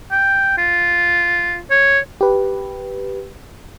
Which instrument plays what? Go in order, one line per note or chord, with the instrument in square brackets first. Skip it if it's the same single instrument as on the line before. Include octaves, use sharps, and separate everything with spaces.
[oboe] G5
F4
C#5
[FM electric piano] G4 B4